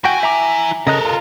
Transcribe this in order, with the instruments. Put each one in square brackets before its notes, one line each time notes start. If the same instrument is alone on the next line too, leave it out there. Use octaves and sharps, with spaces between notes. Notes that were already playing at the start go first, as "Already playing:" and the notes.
[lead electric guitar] E4 G#5 [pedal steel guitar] F#4 G5
[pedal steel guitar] E5 A#5 D6
[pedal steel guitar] C#3 D#5 F#6 [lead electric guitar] A4 A#4
[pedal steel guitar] F4